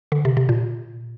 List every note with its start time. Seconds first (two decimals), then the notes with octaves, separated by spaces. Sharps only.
0.12 D3
0.25 C3
0.37 C3
0.49 A#2